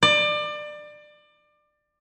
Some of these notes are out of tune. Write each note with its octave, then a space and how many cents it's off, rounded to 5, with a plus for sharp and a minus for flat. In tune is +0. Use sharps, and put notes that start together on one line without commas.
D5 +25